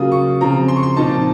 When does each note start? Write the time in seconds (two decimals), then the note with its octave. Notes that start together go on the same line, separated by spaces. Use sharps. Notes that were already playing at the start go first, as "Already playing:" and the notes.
Already playing: C#3 F#3 A#3 F4 D#6
0.12 C#6
0.41 C#3 F3 C4 A#5
0.68 C6
0.76 C#6
0.83 C6
0.96 A#2 F3 C4 D#4 A5